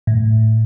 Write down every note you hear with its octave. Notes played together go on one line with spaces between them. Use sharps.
A2